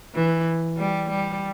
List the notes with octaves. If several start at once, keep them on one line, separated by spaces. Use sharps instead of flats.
E3
G3
G3